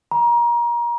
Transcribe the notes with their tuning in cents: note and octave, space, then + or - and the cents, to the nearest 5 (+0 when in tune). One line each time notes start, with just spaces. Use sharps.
A#5 +30